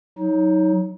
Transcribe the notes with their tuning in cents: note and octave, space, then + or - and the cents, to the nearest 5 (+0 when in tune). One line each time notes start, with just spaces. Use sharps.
F#3 +0 D#4 +25